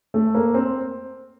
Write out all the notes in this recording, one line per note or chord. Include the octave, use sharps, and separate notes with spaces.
A3
A#3
C4